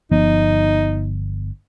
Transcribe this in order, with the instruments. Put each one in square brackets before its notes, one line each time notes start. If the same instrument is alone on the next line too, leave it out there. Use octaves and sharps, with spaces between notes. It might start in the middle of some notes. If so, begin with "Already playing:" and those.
[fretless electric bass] G1 F3 B3 [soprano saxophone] D#4